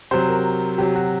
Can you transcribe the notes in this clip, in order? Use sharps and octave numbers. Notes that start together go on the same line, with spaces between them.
C3 F#3 C5
A#4
C3 F#3 G4
F#4